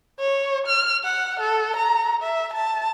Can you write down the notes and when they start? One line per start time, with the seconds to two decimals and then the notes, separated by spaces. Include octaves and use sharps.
0.19 C#5
0.67 F6
1.04 F#5
1.40 A4
1.77 A#5
2.23 E5
2.54 A5